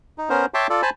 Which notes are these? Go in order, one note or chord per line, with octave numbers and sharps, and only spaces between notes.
D#4
B3 C#4 A#4 C5
C#5 E5 G5 A5 C6 D6
F4 A4 D5
C5 G#5 A5 B5